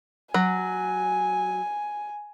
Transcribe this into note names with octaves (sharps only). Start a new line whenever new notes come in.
F#3 G#5